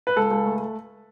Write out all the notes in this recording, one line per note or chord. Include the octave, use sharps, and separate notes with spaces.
B4
C#2 A4
C#2
A3